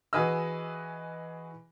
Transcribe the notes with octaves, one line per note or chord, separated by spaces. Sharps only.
E3 F#4 G#4 B4 D#5 E6